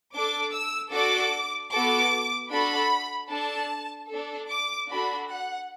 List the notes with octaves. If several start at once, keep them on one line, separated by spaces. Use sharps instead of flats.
D4 A4 D6
E6
D4 F#4 A4 D6
B3 F#4 A4 D6
D4 F#4 A4 B5
D4 A4 A5
D4 A4
D6
D4 F#4 A4 B5
F#5